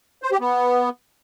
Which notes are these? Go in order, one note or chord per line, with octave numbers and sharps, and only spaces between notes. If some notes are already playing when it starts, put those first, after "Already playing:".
C5
G4
B3